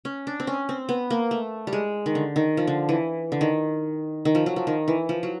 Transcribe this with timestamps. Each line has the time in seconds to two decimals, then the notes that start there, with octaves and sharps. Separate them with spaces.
0.05 C#4
0.27 D4
0.40 C4
0.47 C#4
0.69 C4
0.89 B3
1.10 A#3
1.31 A3
1.67 G3
1.73 G#3
2.06 D#3
2.15 D3
2.36 D#3
2.57 F3
2.67 D3
2.89 E3
3.32 D3
3.41 D#3
4.25 D#3
4.35 F3
4.46 F#3
4.56 F3
4.67 D#3
4.88 E3
5.09 F3
5.23 F#3